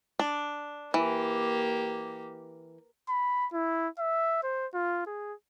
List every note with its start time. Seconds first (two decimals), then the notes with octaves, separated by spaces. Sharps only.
0.19 D4
0.94 E3 A#3 G4
3.09 B5
3.53 E4
3.99 E5
4.43 C5
4.74 F4
5.07 G#4